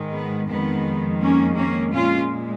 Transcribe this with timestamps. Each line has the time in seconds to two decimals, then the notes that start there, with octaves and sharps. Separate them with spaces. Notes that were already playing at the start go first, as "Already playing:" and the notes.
Already playing: G#2 D#3 G#3
0.14 B3
0.50 F2 D#3 G#3 B3
1.21 A#3 C#4
1.57 A#3 C#4
1.93 A#2 G#3 C#4 F4